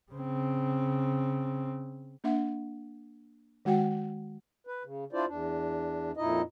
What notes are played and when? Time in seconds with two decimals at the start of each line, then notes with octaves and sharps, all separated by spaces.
0.12 C#3 C4
2.24 A#3 D4 E5 F#5
3.65 D#3 G#3 F#4 F#5 G5
4.67 B4
4.84 C#3
5.13 D4 E4 F4 C5 D5
5.27 E2 D4
6.17 F2 A#2 D#4 E4 D#5